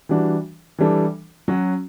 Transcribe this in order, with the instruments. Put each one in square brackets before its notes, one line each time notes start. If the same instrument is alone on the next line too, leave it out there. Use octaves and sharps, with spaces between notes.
[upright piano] E3 G3 D4 F#4
E3 G3 D4 A4
F#3 C#4 F#4